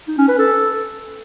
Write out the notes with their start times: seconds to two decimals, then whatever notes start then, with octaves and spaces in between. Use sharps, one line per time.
0.08 D#4
0.18 C#4
0.28 B4
0.38 A4